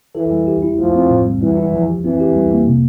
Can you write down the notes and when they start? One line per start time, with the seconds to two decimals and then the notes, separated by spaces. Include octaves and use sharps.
0.15 E3 A4
0.31 G3
0.47 G4
0.62 E4
0.78 F3 A3
0.94 C4
1.10 A2
1.26 G3
1.41 E3 G3
1.57 E4
1.72 F3
1.89 G4
2.04 E3 C4
2.20 G4
2.36 G3
2.52 A#3
2.67 C3